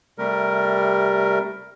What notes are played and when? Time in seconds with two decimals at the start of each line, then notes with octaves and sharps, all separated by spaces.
0.18 C3 G3 A3 A#4